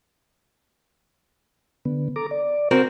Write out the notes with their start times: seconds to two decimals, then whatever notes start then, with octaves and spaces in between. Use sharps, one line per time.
1.85 D3 B3
2.16 A4 A#5 D6
2.31 D5
2.71 C4 F#4 A#4